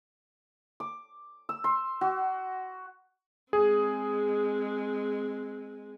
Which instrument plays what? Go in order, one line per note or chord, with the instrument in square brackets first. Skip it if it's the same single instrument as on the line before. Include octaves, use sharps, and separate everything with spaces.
[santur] D6
E6
C6
F#4
[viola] G#3 C4 [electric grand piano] G#4